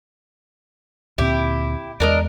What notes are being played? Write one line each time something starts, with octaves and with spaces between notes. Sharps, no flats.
D2 A#2 C4 E4 G4
E2 G#3 D4 A#4 D#5